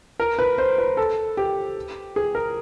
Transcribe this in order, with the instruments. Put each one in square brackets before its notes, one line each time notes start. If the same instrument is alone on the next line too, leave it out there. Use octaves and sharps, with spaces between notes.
[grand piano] A#4
B4
C5
B4
A4
G4
G#4
A#4